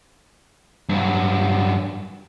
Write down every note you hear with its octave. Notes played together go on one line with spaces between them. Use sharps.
G2 F#3